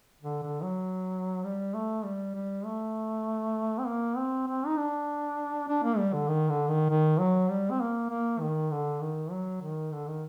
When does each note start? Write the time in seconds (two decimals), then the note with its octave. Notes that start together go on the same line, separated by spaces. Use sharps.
0.23 D3
0.43 D3
0.63 F#3
1.44 G3
1.74 A3
2.05 G3
2.35 G3
2.65 A3
3.79 C4
3.86 A#3
4.17 C4
4.47 C4
4.66 D#4
4.77 D4
5.68 D4
5.83 A#3
5.98 G3
6.13 D3
6.28 D#3
6.49 D3
6.69 D#3
6.89 D#3
7.19 F#3
7.50 G3
7.70 C4
7.80 A#3
8.10 A#3
8.40 D#3
8.71 D3
9.01 D#3
9.31 F#3
9.61 D#3
9.92 D3
10.07 D#3